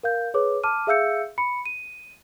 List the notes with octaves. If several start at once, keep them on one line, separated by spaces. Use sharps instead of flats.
A#4 F5 G6
G#4 B4 C#5 D6
A5 D6 F6 D#7
G#4 E5 F5 E6 G6 C#7
B5 C#7
D#7